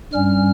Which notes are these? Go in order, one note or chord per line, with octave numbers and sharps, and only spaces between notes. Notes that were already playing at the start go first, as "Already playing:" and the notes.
G2 G3 C#4 F6